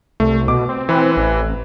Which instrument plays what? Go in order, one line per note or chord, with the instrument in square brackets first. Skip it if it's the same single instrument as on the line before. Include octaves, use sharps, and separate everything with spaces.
[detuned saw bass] C2 [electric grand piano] A3
[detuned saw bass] B2 [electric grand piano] D6
[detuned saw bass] C4
[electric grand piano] E3 B4
[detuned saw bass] A1